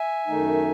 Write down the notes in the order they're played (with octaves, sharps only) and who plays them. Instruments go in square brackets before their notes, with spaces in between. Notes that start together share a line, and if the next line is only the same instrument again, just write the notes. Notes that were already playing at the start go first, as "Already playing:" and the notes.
Already playing: [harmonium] E5 G#5
F#2 D#3 A3 D#4